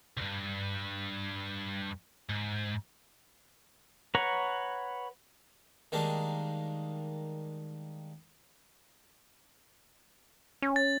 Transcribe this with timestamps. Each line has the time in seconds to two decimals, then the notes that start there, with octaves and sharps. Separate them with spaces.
0.17 C#2 G2
2.29 G#2
4.15 B4 C#5 F#5 A#5 C#6
5.92 D#3 G3 G#3 A#3 D4
10.62 C#4
10.76 A6